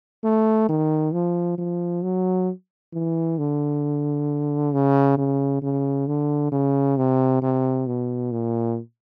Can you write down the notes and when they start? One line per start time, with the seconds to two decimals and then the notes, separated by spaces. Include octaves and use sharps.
0.24 A3
0.69 D#3
1.13 F3
1.58 F3
2.03 F#3
2.94 E3
3.38 D3
4.73 C#3
5.18 C#3
5.62 C#3
6.07 D3
6.52 C#3
6.97 C3
7.42 C3
7.87 B2
8.32 A#2